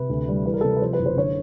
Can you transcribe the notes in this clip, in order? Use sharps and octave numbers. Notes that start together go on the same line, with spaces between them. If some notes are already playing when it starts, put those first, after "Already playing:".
Already playing: C3 B4
D2
G3
E3 B4
A#4
A4
C3 A#4
B4
F3 C5
B4
F#1
C5
D3 C#5